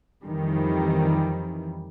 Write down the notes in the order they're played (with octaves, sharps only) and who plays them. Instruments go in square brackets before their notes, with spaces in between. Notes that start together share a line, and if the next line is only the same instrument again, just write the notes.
[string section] F2 D#3 E3 G3